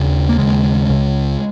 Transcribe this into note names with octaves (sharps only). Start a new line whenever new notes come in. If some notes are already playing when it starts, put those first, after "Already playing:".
Already playing: D#2 C#3
A#3
D#2 C#3 G#3
C#2 C#3